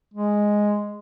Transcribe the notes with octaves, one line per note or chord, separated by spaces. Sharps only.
G#3